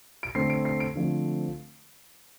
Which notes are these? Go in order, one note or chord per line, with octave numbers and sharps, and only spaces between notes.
D7
D3 A3 C4 C7
D7
C7
D7
D3 F3 A3 C4